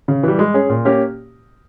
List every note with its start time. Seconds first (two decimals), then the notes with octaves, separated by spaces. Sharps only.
0.08 C#3
0.23 E3 G3
0.39 G#3
0.54 C#4 G#4
0.69 A#2
0.85 A#3 C#4 G4